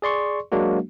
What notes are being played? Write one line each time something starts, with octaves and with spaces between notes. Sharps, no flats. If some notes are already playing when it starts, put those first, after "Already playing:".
G#4 D5 C6 C#6
F#3 G#3 A#3 D4 F#4